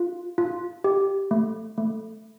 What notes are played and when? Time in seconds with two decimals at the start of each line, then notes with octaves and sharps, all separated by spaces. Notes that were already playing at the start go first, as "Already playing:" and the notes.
Already playing: F4
0.38 F4
0.84 G4
1.31 A3
1.78 A3